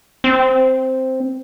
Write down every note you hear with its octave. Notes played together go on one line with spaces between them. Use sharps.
C4